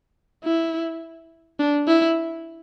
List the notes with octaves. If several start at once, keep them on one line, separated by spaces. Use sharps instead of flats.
E4
D4
E4